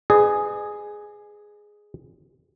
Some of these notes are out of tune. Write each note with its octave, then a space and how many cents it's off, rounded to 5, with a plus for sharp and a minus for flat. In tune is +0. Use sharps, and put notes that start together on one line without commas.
G#4 +0 B4 +35 D#5 -45